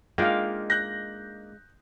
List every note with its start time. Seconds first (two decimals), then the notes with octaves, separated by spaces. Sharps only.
0.18 G#3 A#3 D4 D#4 F4 F5 G5
0.70 F#6 G6 A#6